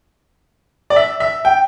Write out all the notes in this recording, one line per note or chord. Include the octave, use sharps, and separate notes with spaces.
D5
E5
E5
G5